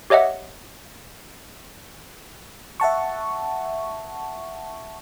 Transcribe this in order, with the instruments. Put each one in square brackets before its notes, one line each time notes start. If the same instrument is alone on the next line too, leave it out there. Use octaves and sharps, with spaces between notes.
[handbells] G4 C#5 D#5 E5 F#5
[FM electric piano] E5 F#5 A5 C#6